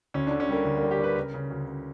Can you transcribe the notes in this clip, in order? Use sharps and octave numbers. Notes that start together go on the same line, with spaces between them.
D2 C#4
D4
D3
C#4
G3 A#3
D2
A#3
G3
G4
G3 B4
C#3 A#4
C#3
D2
C#3